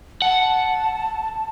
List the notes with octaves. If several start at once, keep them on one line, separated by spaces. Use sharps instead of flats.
F#5 A5